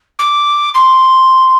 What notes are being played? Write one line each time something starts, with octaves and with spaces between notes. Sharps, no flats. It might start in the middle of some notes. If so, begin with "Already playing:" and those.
D6
C6